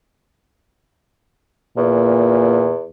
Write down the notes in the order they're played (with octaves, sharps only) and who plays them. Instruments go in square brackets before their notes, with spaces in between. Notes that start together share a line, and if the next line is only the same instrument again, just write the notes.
[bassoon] E2 [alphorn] A#2